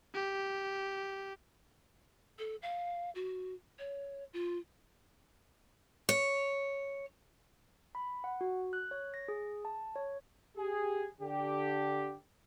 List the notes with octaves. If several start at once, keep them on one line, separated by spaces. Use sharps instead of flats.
G4
A4
F5
F#4
C#5
F4
C#5
B5
F#5
F#4
F#6
C#5
A#6
G#4
A5
C#5
G4 G#4
D3 G4